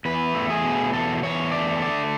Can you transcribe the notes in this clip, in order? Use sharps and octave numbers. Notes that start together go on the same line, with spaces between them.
E2 B4
A3
G#4
B2
E2 A4
E2 C#5
A3 D5
D3 D5